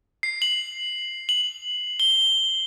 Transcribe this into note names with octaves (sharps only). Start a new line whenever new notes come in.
C7
F#7
F#7
G7